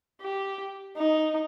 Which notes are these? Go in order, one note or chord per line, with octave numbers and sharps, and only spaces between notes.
G4
D#4